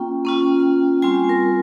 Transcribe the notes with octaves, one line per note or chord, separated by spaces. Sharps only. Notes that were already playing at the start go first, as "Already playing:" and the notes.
Already playing: A#3 C#4 F4 G5
A#3 C#4 F4
G3 C4 F4 G#5
A#4